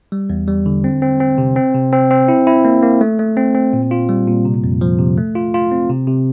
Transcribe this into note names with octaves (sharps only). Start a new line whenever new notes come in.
G3
E2
G3
D3
C4
C4
C4
C3
C4
C3
C4
C4
E4
E4
A#3
A#3
A3
A3
C4
C4
A#2
F4
G3
A#2
C3
F2
F3
C3
A3
F4
F4
C4
C3
C3